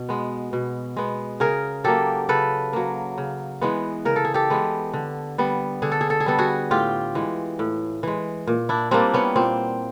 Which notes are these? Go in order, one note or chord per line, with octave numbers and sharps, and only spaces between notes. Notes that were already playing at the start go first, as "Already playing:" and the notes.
Already playing: B2
G#3 B3
B2
G#3 B3
C#3 G#4 A#4
F#3 A#3 G4 A4
C#3 A4 B4
F#3 A#3
C#3
E3 G#3 B3
C#3 A#4
A4
G#4
G4 A4
E3 G#3 B3
D3
G3 B3
D3 G#4
A4
G#4
A4
G#4
G3 B3 A4
F#4 G#4
A2 F4 G4
E3 G#3
A2
E3 G#3
A#2
D4 E4
G3 A#3 C4 D4
B3 C#4
A#2 C4